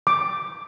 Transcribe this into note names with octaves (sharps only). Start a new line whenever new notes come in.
D6